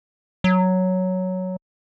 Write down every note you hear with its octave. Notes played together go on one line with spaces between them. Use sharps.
F#3